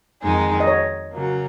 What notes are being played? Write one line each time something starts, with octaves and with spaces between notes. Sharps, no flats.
F2 D#3 G#3 D#4 G#4
D#5
C#5
C#3 F#3 A#3